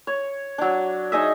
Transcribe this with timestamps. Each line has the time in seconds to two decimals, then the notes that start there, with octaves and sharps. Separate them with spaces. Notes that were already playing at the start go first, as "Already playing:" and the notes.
0.07 C#5
0.58 F#3 D4
1.12 D#4 G#4 D#5 E5